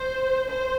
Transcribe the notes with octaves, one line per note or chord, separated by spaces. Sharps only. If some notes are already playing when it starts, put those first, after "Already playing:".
Already playing: C5
C5